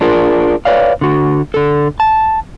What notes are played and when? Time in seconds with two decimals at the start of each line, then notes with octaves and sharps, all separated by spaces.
0.01 D4 F4 G#4 A#4
0.65 B4 C#5 D5 F5
1.01 D3 F#4
1.54 D3 A4
2.00 A5